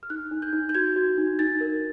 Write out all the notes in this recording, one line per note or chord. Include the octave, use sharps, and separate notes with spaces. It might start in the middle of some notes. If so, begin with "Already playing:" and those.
F6
D#4 F#6
D#4
G6
D#4
G6
F#4 G#6
F#4
D#4
D#4 A6
A#4